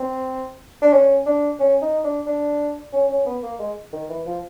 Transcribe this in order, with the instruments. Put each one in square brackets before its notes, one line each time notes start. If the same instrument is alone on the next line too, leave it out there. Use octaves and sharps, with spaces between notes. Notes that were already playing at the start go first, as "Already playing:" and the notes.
Already playing: [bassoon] C4
D4
C#4
D4
C#4
D#4
D4
D4
C#4
C#4
B3
A#3
G#3
D#3
E3
F3